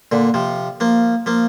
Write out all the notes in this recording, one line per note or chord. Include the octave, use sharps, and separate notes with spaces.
A#2 D3
C3 F3
F3 A#3
F3 A#3